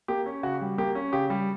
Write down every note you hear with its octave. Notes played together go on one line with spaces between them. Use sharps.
A#3 G4
C#4
C#3 F#4
G3
A#3 G4
C#4
C#3 G4
G3